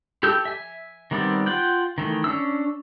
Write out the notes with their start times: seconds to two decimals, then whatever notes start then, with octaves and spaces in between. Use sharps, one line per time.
0.23 G4 A4 E6 G6
0.45 E5 G#5
1.11 D#3 G3 B3 C4 D5
1.46 F4 F#5 G5
1.98 D#3 E3 A3
2.24 C#4 D4 E6